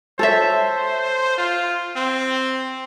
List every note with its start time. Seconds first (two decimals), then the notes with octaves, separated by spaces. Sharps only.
0.19 A4 C5 C#5 E5
1.38 F4
1.96 C4